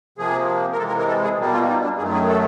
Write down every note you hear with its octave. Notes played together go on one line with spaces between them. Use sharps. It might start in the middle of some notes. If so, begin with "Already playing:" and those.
C3 F3 A#3 G#4
A#4
C3 E3 G#3 A4
A#4
A#4
A4
G#4
B2 G3 A#3
F4
D#4
D4
F#2 D#3 F#3 A3 G#4
G#4
A4